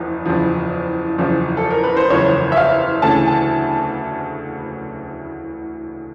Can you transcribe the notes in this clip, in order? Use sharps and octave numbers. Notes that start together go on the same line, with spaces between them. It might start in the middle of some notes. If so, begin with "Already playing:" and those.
Already playing: F#1 E2 F3
F#1 E2 C#3 F3
F#1 E2 C#3 F3
A4
A#4
B4
C5
F#1 E2 C#3 F3 C#5
E5
F5
D2 C#3 E3 A3 A5
G#5
A5